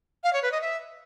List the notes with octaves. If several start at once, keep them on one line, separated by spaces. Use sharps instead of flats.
F5
C#5
B4
D#5
E5